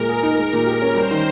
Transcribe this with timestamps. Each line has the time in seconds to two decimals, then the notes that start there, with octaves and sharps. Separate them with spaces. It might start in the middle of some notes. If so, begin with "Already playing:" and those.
Already playing: A#2 G#3 A#4
0.09 G#4
0.23 D#4
0.37 G#3
0.53 A#2
0.66 G4
0.82 C#4
0.95 G3 C5
1.11 D#3